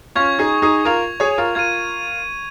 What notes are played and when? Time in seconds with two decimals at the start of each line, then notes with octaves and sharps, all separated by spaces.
0.15 C#4 F4 C#6 G#6 F7
0.39 D#4 G#4
0.62 D#4 G#4
0.85 F4 A#4 C#6 G#6 F7
1.20 G#4 C#5
1.38 F4 A#4
1.55 F4 A#4 G#6 D#7